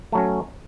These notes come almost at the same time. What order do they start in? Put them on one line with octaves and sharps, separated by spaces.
A3 F#3 C#4